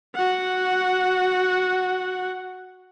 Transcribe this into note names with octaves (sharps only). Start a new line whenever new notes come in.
F#4 F#5